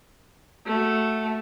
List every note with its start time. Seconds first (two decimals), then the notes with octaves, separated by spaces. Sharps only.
0.66 A3 F#4